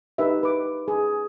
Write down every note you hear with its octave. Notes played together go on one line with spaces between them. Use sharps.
D#4 G4 A#4 B4 E5
B4 D6
G#4